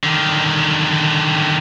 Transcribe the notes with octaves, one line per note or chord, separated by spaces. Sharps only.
D3 D#3